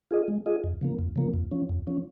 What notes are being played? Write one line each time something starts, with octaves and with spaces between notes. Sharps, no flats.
F4 G#4 D#5
G#3
F4 G#4 D#5
F2
C#3 F3 A#3
F2
C#3 F3 A#3
F2
F3 C#4
F2
F3 C#4